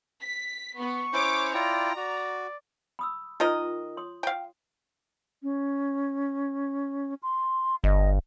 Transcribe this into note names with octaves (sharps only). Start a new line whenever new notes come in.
B6
B3 C#6
C#4 E4 C5 C#5 D6
E4 F4 D5 G5 A#5
F#4 D5
B5 D#6 E6
D#3 F4 A#4 D#5
C#5 C6 D#6
F5 G5
C#4
C6
G1 D#5